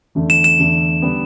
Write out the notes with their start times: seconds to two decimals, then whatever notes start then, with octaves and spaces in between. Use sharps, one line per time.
0.15 E2 D3 A3
0.30 E7
0.44 E7
0.59 E2 D3 A3
1.02 D3 G3 B3